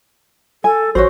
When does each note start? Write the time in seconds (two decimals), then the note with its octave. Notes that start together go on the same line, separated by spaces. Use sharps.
0.64 A4 G#5
0.95 A1 F#4 C5 C#5